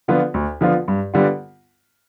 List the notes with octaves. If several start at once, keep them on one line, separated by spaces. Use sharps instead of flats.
D3 F3 B3 F4
D2
D3 F3 B3 F4
G2
D3 G3 B3 F4